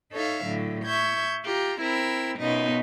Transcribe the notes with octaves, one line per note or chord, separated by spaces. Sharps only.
D#4 A4 C#5 E5 F5
A2 D3 F#3
E5 C#6 G6 G#6
F4 G4 A#5
C4 E4 A#4 B5 E6
F#2 B2 B3 D#4 F4